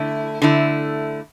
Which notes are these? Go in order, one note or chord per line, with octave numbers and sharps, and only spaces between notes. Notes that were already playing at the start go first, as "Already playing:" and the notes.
Already playing: D3 A3 E4
D3 A3 E4